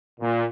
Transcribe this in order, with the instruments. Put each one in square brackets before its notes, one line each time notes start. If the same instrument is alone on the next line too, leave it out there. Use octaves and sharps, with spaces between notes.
[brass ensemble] A#2